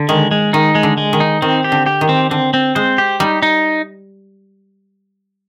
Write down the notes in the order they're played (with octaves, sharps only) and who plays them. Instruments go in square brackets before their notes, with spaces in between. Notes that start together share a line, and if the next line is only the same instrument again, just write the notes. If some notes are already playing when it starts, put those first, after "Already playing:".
Already playing: [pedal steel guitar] D3
[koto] D#3 [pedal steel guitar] G#3
[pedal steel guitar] G#3
[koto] D#3 [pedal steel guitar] D#4
[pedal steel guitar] G#3
[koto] D3
[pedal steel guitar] G#3
[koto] D#3
[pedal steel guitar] D#4
[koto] D#3 [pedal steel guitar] C4
[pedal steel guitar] G4
[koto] D3
[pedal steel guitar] G4
[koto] D#3
[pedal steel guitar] C4
[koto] D3 [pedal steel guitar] C4
[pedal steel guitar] C4
[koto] G#3 [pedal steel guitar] C5
[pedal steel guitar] G4
[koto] G3 [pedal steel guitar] D#4
[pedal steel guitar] D#4